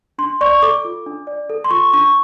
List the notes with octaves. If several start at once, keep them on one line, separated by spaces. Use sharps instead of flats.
D4 C6
D5 C#6
A4 D6
F4
D4
D5
A4
C6
F4 C#6
D4 C#6